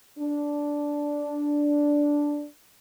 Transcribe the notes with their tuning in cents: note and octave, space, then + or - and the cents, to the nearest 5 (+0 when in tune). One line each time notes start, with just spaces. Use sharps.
D4 -5